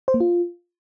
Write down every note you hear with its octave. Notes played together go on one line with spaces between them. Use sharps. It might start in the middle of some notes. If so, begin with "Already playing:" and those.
C5
A#3
F4